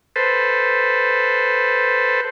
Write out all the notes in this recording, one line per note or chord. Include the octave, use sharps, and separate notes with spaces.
A4 B4 C5